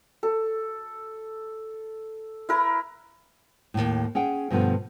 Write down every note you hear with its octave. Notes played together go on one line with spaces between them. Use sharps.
A4
E4 A#4 B4
D#2 A2
C#4 G#4 F#5 G5
G2 B2 D3 F3 A3 B3